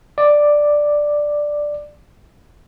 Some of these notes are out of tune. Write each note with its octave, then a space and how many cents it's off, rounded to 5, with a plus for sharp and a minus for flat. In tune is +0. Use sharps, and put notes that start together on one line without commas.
D5 +5